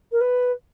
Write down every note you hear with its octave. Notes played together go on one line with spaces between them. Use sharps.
A#4
B4